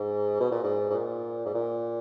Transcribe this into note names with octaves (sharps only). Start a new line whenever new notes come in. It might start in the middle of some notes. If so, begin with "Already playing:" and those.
Already playing: G#2
B2
A#2
G#2
G#2
A#2
G#2
A#2